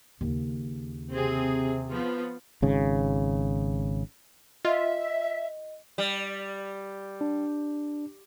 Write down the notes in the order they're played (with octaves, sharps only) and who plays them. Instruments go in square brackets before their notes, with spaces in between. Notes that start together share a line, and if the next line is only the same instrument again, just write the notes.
[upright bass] D#2 C#3
[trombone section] C3 [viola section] C4 G#4
[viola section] F3 B3 F4
[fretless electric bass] G#1 C#3
[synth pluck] F4 [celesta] D#5 [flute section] E5
[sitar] G3
[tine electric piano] D4